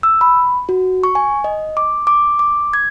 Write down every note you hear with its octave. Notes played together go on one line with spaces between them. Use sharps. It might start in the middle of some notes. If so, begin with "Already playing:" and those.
E6
B5
F#4
C#6
G#5
D#5
D6
D6
D6
G#6